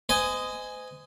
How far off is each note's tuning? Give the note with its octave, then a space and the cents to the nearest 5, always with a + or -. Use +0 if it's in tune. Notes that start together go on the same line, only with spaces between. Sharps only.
C5 -40 D#5 +0 G#5 +0